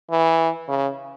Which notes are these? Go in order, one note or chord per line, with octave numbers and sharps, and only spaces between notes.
E3
C#3